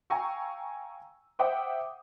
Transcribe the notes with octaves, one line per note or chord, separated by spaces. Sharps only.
F5 G5 G#5 A#5 C#6 E6
C5 E5 F#5 G5 D6 D#6